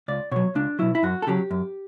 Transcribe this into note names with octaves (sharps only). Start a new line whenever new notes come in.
C#2 D5
B2 F#3 C#5
C#2 D4
B2 F#3 E4
E4
F#2 F#4
A4
C#3 F#3 G4
F#2